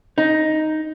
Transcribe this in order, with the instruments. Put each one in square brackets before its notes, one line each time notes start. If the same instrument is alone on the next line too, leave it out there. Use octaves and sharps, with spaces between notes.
[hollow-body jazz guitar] D#4